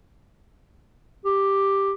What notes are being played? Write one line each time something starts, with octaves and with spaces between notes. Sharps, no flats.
G4